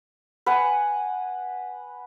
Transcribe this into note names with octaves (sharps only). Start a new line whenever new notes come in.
B4 F#5 G#5